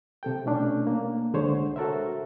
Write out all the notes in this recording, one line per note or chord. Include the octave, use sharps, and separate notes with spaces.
C3 A4 G5
B2 A3 C#4 D4
A#3
C2 D3 G#3 C5 C#5
F#4 A4 A#4 C5 E5